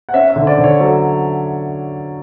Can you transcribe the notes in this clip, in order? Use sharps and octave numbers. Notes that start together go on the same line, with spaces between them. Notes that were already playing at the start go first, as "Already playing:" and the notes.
F#5
C#4 E5
E5
D3
D5
D3
C#5
F#3 A4